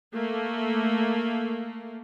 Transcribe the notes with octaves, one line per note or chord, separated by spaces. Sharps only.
A3 A#3